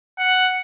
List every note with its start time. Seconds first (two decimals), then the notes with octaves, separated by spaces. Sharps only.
0.18 F#5